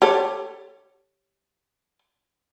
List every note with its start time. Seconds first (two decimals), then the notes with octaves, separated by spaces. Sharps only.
0.02 G4 A4 C#5